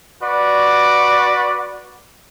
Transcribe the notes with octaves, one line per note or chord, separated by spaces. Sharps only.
F#4 B4 D5